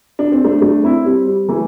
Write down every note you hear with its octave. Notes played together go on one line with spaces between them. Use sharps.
D4
C4
A3 D4
A3 D4
C4 E4
G3 C4
G3
E3 A3